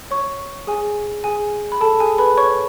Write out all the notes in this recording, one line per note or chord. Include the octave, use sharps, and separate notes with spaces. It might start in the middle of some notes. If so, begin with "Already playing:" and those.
C#5 C#6
G#4 G#5
G#4 G#5
B5
A4 A5
G#4 G#5
B4 B5
C#5 C#6